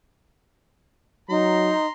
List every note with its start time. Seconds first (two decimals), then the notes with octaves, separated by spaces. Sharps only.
1.30 F#3 D#4 A#5 C6